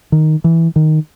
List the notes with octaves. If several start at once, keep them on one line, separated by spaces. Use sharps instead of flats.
D#3
E3
D#3